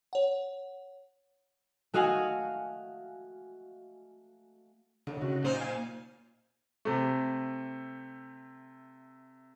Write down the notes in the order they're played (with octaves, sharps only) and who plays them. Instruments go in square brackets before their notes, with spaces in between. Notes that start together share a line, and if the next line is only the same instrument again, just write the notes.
[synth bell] C#5 F#5
[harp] A3 F#4 D#5 F5 F#5 G#5
[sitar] D#2 [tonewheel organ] D3
[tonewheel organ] C#3 F#4
[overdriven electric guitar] A#2 [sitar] F#3 D#4 C5 [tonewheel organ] C#4
[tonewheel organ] F5 G#5
[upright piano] C3 A3